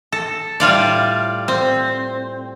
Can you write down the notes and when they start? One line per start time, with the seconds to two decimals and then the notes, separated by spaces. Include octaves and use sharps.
0.12 A4
0.60 A2 G3 F4 D5
1.48 C4